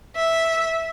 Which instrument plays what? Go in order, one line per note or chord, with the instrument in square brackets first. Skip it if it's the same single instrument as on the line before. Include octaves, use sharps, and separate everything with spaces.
[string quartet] E5